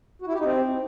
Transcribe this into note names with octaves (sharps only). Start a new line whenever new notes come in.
F#4
E4
G4
D#4
C4